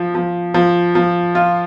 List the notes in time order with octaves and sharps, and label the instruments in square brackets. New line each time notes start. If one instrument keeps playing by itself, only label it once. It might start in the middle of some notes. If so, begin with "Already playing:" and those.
Already playing: [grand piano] F3
F3
F3
F3
F4